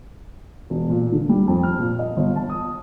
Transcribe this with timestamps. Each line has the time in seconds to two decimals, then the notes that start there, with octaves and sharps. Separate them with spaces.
0.70 E1
0.90 A#2
1.12 D3
1.29 G3
1.48 F2
1.63 F6
1.79 A#2
1.99 D#5
2.17 G1
2.36 A5
2.50 D#6